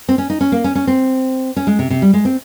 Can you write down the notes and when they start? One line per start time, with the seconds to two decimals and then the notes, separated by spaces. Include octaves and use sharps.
0.09 C4
0.18 C#4
0.30 D#4
0.41 C#4
0.52 A#3
0.64 C#4
0.75 C#4
0.87 C4
1.56 C#4
1.67 G#3
1.79 C3
1.90 C3
2.02 G3
2.14 G#3
2.25 C4